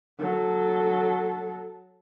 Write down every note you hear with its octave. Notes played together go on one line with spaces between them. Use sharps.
F#3 A4